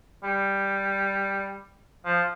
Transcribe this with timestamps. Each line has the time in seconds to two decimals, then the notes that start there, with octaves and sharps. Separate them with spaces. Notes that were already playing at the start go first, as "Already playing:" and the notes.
0.23 G3
2.05 F3